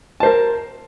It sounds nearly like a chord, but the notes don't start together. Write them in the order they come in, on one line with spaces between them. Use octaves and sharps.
A5 C5 A#4